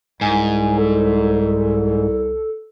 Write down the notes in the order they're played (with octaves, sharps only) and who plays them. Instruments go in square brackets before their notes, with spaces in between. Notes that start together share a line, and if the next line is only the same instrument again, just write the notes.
[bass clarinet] C2 [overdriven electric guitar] G#2 [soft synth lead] G#5
[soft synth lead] A4